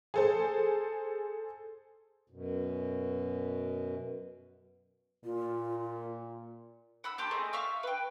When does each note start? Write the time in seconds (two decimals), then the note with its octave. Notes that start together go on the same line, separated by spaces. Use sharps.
0.14 G#4 A4 C5
2.30 F#2 B2
5.24 A#2 F4
7.04 F#5 B5 E6
7.18 A#3 G4 A5 C6
7.31 A3 C4 G#4 D#5
7.53 E5 F5 C#6 E6
7.83 B4 G5